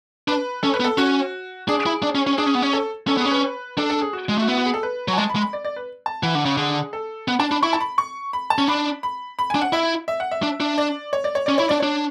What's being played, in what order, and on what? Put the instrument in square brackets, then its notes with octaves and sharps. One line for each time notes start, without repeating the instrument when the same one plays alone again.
[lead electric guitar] D4 [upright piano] B4
[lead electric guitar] C#4 [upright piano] A4
[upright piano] B4
[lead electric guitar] B3
[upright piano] A4
[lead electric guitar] C#4 [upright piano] F#4
[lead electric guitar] D4 [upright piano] G#4
[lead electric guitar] E4
D4
C#4
C#4
[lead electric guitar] D4 [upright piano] G#4
[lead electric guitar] C#4
B3
C#4
[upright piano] A4
[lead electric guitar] C#4 [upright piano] A4
[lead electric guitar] B3 [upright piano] G#4
[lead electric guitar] C#4
[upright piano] B4
[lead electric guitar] D4 [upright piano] A4
[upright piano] A4
G#4
F#4
[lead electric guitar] G#3
[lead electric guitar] A3 [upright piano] F#4
[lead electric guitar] B3 [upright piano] E4
[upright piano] F#4
G#4
A4
B4
[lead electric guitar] F#3
[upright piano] G#5
[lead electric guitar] G#3 [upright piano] A5
[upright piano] B5
[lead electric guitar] G#3
[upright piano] B5
D5
D5
B4
A5
[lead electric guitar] E3 [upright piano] F#5
[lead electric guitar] D3
C#3
[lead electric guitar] D3 [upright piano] G#4
[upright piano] A4
[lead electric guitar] B3 [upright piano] F#5
[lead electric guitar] D4 [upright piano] A5
[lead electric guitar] D4 [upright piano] B5
[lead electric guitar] E4 [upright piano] C#6
[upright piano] A5
B5
C#6
B5
A5
[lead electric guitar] C#4
[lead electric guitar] D4 [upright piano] B5
[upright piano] B5
B5
G#5
[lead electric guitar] D4
[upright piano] F#5
[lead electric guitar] E4 [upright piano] E5
[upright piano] E5
F#5
E5
[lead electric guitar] D4
D4
[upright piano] D5
C#5
D5
C#5
[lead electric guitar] C#4 [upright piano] D5
[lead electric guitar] E4 [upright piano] C#5
[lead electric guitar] D4 [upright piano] D5
[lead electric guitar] D4 [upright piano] C#5